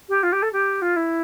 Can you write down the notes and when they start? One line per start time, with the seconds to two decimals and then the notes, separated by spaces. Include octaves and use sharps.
0.09 G4
0.23 F4
0.32 G4
0.42 A4
0.52 G4
0.81 F4
0.96 E4